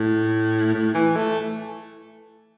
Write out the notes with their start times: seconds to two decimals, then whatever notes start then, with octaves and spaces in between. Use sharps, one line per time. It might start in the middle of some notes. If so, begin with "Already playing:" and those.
Already playing: A2
0.74 A2
0.94 E3
1.16 A3